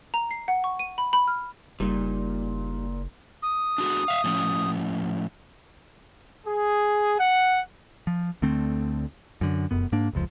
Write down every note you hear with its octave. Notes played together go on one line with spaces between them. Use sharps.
A#5
C7
F#5
C#6
D#7
B5
B5
F6
F#1 A#2 G3 D#4
D#6
D4 F#4 G#4
E5 F5
A2 F3 C#4
G#4
F#5
F3
D2 D3 A3 C4
F#2 D3
F1 F#2 B3
G#2 A#3 D4
F1 C#2 F3